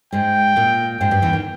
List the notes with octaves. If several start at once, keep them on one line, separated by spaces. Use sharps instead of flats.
G#2 G#3 G5
A#2 A#3
G#2 G#3 G5
G2 G3
E2 E3
D#3